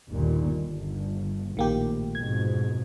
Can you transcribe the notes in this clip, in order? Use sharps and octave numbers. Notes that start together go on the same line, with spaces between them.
G1 D#2 A#2
G1
A#1 A2 D#3 A#3 G4
F2 G#2 B2 G#6